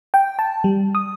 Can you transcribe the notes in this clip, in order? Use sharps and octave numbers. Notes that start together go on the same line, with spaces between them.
G5
A5
G3
D#6